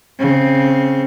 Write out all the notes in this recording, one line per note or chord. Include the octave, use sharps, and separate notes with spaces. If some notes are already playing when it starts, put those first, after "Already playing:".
C#3 C4